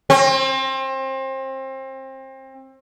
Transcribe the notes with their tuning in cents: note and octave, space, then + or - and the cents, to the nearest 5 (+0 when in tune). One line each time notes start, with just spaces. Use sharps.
C4 +30